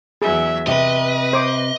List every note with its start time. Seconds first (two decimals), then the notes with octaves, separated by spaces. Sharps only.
0.22 E2 F#3 G#4 E5
0.67 C3 B4 D#5
1.33 C5 D6